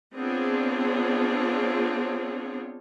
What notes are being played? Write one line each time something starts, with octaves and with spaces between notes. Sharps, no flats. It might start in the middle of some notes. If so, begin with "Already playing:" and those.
B3 C4 D4 F4 G#4 C#5